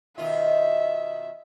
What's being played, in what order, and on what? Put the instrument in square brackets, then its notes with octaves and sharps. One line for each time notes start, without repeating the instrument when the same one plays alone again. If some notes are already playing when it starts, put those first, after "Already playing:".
[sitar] B2 D#3 F4 [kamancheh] E5